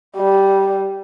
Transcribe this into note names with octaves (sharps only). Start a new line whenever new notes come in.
G3